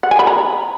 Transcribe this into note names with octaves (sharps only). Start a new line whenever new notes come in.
F#5
G#5
B5
A#5